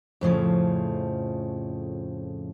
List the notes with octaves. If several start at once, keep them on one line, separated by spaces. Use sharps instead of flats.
F2 A2 C#3 F3